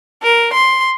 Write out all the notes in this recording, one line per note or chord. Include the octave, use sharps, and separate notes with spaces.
A#4
C6